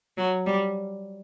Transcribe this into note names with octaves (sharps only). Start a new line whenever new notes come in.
F#3
G3